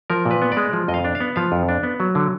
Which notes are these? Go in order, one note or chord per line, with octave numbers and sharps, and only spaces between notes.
F3 A#4
A#2
B4
B3
D5
G#3
F3
F2 D#5
F5
D4
F5
B3
F3 F5
F2
D4
B3
F#3
D3